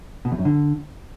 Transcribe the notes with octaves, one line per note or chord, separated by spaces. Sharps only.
B2
E2
F#2
D3